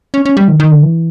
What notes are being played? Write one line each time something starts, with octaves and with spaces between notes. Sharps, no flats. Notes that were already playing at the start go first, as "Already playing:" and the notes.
C#4
C#4
G3
D#3
D#3
D3
E3